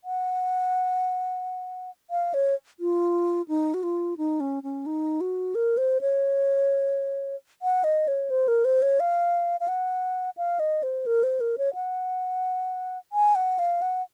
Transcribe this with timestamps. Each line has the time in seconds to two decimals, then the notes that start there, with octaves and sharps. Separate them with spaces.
0.04 F#5
2.10 F5
2.34 C#5
2.80 F4
3.48 D#4
3.74 F#4
3.83 F4
4.17 D#4
4.40 C#4
4.63 C#4
4.86 D#4
5.21 F#4
5.55 A#4
5.77 C5
6.01 C#5
7.62 F#5
7.84 D#5
8.08 C#5
8.30 C5
8.48 A#4
8.65 C5
8.82 C#5
9.00 F5
9.60 F5
9.68 F#5
10.37 F5
10.60 D#5
10.83 C5
11.06 A#4
11.23 C5
11.40 A#4
11.58 C#5
11.74 F#5
13.13 G#5
13.35 F#5
13.59 F5
13.82 F#5